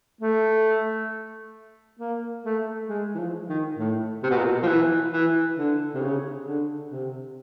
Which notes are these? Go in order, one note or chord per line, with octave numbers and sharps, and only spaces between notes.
A3
A#3
A3
G#3
E3
F3
D#3
A2
C3
B2
A#2
B2
F3
E3
E3
D3
C3
C#3
D3
C3